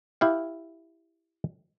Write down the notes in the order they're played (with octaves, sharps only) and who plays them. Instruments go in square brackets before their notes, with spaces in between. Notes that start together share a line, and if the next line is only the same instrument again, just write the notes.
[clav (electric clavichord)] E4 G4 F5